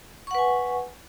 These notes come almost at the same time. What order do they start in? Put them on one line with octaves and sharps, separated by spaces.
C#6 F#5 B4 G#5